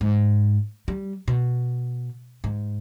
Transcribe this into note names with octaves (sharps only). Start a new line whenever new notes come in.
G#2
G3
B2
G#2